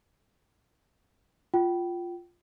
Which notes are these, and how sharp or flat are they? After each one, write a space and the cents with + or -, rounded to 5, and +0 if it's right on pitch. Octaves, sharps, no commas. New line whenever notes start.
F4 +0 G5 -30